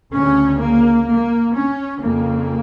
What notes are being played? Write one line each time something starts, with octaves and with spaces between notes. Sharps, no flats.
D2 C#3 C#4
A#3
A#3
C#4
F2 C#3 A#3